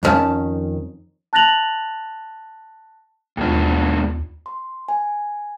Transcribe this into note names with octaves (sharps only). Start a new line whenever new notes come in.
F2 A2 D#3 C#4 A5
A5 F#6 A6 A#6 F7 F#7
D#2 G#2 B2 D4 F4
C6
G#5